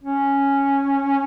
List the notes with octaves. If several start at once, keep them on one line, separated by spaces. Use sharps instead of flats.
C#4